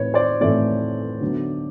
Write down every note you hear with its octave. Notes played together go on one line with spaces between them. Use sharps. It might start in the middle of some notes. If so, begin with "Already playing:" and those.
Already playing: A2 E3 A3 C4 B4 C#5
C5 D5
A2 E3 A3 C4 D5 E5
D3 F#3 B3